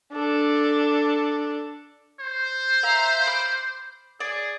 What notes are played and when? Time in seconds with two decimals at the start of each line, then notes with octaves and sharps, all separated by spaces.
0.12 D4 A4
2.20 C5
2.83 E5 F5 A#5
3.27 B5 D6 F6
4.20 G#4 D5